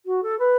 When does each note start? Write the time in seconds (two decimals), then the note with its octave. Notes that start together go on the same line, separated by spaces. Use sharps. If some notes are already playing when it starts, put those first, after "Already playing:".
0.05 F#4
0.22 A4
0.38 B4